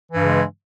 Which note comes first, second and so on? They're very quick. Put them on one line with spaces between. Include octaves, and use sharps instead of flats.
E3 G2 C#3 G#3